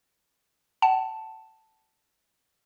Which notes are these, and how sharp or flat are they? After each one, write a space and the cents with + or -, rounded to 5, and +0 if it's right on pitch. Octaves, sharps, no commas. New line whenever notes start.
F#5 +35 A5 +0